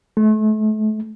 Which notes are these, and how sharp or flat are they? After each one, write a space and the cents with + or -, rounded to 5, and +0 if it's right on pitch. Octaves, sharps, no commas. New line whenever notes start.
A3 -35